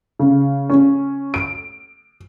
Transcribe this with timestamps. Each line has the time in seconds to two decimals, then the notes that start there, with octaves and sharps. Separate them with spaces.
0.19 C#3
0.70 C#4
1.34 D7